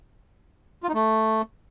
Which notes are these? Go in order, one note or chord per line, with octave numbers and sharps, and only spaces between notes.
F4
D#4
A3